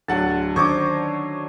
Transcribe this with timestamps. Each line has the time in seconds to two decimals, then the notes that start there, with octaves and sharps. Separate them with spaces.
0.08 D1 D3 F#3 F#5 A5
0.56 D#3 C#4 D4 C5 C#5 D#5 C#6 D6